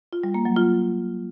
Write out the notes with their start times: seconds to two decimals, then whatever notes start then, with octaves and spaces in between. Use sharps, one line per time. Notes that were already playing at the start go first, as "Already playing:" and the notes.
0.13 F4
0.24 G3
0.34 A#3
0.45 F#3
0.56 F4